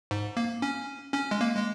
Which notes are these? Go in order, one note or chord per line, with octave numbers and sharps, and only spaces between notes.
G#2
A#3
C#4
C#4
G#3
A#3
G#3